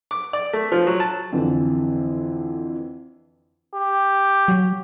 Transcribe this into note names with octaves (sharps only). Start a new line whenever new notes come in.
D6
D5
A3
F3
F#3
A5
F2 D3 E3
G4
F#3